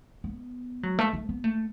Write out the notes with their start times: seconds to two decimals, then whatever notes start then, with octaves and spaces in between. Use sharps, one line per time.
0.24 B3
0.83 F#3
0.99 A3
1.13 A3
1.29 B3
1.44 A3